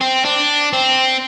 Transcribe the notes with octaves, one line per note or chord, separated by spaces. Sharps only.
C4
D4
C4